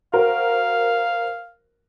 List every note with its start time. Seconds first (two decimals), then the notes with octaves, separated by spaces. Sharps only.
0.13 F#4 A#4 C5 F5